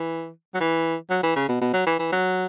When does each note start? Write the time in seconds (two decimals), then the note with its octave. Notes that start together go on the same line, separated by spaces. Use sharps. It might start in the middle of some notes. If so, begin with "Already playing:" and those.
Already playing: E3
0.54 F#3
0.60 E3
1.10 F#3
1.23 E3
1.36 C#3
1.49 B2
1.61 B2
1.74 F#3
1.86 E3
1.99 E3
2.12 F#3